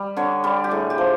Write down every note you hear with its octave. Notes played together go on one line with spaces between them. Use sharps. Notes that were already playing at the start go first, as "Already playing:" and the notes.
Already playing: G3
D3 C#5
G3 D5
G4
A2 G#4
G4
F3